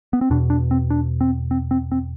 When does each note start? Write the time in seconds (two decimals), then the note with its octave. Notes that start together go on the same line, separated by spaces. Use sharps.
0.13 B3
0.21 C4
0.30 E2 B2 D4
0.50 D4
0.71 C4
0.90 D4
1.21 C4
1.51 C4
1.71 C4
1.92 C4